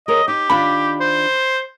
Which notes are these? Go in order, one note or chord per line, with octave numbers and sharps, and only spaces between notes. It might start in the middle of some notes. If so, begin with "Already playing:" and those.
G#4 A#4 C#5 D#5
D#4 G4
D#3 D4 F4 B5
C5